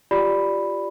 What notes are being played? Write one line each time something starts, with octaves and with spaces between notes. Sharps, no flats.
F4 G4 D5 B5